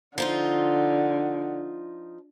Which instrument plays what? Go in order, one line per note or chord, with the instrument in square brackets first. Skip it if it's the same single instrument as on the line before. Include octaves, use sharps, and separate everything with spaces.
[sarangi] D3 [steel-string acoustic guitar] F3 D#4 F4